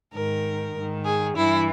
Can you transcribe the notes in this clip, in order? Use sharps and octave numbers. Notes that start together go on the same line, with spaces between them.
G#2 D#3 A#4
G#2 D#3
G#4
G2 E3 E4